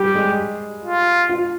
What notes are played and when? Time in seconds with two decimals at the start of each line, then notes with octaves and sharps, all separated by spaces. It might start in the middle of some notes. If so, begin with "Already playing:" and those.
Already playing: G3 G4
0.15 G#3
0.84 F4
1.29 F4